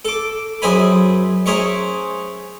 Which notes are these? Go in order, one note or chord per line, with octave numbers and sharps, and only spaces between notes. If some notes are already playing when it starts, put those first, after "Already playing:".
A4 D6
F#2 G#4 C5 E5 G#5 B5
C#4 G#4 A#4 C5 E5 C#6